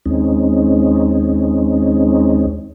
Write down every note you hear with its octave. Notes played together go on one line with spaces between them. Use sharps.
D#2 G#3 C4 C#4 D#4